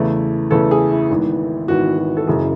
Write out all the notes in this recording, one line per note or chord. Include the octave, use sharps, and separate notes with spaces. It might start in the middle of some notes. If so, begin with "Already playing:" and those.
Already playing: E2 C#3 E3 A3
E2 C#3 E3 A3 A4
G#4
E4
G#1 G#2 E3 B3
G#1 G#2 E3 B3 F#4
F#4
A4
F#1 F#2 C#3 E3 G#4